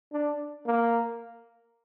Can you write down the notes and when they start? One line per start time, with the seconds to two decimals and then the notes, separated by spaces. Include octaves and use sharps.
0.13 D4
0.67 A#3